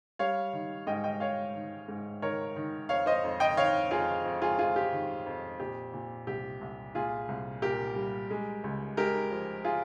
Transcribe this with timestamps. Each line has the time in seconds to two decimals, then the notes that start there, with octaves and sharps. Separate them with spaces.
0.19 G3 C#5 F5
0.53 D#3
0.87 G#2 D#5 G5
1.04 D#5 G5
1.20 G#2 C#5 F5
1.55 D#3
1.88 G#2
2.22 D#3 A#4 C#5
2.56 D#3
2.89 F2 C#5 F5
3.06 C5 D#5
3.24 F2
3.40 D#5 G5
3.57 D#3 C#5 F5
3.91 F2 F4 G#4
4.25 F2
4.42 F4 G#4
4.59 F2 F4 G#4
4.76 G4
4.92 D#3
5.26 F2
5.60 A#2 G4
5.94 A#2
6.27 C2 G4
6.61 C2
6.95 A#2 F4 G#4
7.28 C2
7.62 A#2 G4 A#4
7.96 G3
8.30 G#3
8.64 C#2
8.97 G#3 G4 A#4
9.31 F3
9.64 F4 G#4